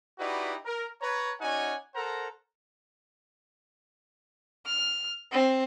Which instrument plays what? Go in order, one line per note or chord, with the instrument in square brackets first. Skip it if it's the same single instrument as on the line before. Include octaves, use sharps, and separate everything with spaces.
[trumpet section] D#4 E4 F#4 G4 B4 D5
A#4
B4 C#5 A#5
C#4 D#4 F#4 D5 F#5 G#5
A4 A#4 C5 F#5 A#5
[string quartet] F6
C4